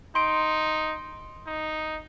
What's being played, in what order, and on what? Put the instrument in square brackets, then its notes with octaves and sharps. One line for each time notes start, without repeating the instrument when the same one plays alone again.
[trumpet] D#4 [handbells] C6 D7
[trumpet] D#4